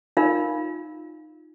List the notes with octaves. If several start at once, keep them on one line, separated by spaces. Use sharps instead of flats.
D#4 F4 A#4 F5